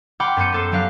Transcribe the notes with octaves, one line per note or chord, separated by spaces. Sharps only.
F#5 G5 B5 C6 D6 F6
F#2 B3 C6 G6 C#7 D#7
B3 A4 C5
F#3 D4 G4 F5 F#6